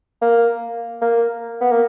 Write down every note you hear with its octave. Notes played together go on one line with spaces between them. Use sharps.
A#3
A#3
B3
A#3